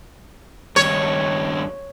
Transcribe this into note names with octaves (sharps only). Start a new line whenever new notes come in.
G2 D#3 C#5